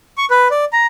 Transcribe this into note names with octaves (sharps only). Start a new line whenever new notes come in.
C#6
B4
D5
A#5